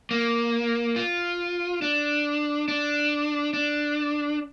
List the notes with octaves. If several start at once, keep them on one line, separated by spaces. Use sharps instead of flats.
A#3
F4
D4
D4
D4